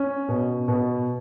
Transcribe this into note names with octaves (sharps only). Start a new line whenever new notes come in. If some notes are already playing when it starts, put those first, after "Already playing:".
Already playing: C#4
B2
B2